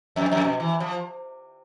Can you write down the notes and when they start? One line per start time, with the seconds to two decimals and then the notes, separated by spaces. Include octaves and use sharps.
0.16 F2
0.32 F2
0.44 B2
0.60 E3
0.80 F3